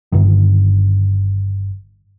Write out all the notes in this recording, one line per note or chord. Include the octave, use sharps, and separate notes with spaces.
G1 G2 D3 D#3